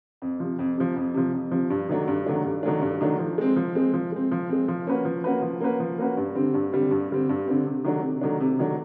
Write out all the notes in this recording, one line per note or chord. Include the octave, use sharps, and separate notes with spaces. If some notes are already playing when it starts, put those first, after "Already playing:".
F2
C3 F3
F2
C3 F3
F2
C3 F3
F2
C3 F3
G2
D#3 F#3 A3 D4
G2
D#3 F#3 A3 D4
G2
D#3 F#3 A3 D4
G2
D#3 F#3 A3 D4
F3
G#3 C4
F3
G#3 C4
F3
G#3 C4
F3
G#3 C4
F3
A#3 C#4 F#4 B4
F3
A#3 C#4 F#4 B4
F3
A#3 C#4 F#4 B4
F3
A#3 C#4 F#4 B4
G2
D3 G3 C4
G2
D3 G3 C4
G2
D3 G3 C4
G2
D3 G3 C4
C3
D#3 F#3 A3 D4
C3
D#3 F#3 A3 D4
C3
D#3 F#3 A3 D4